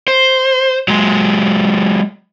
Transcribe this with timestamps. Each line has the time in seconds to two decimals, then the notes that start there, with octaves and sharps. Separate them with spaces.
0.08 C5
0.88 F#3 G#3